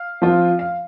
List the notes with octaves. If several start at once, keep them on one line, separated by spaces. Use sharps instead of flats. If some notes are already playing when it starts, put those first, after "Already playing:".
Already playing: F5
F3 C4 F4
F5